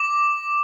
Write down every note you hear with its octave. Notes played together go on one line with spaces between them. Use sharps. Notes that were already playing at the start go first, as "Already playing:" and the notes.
Already playing: D6